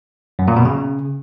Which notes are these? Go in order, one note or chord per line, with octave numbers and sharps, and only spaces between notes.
F#2
A#2
B2
C#3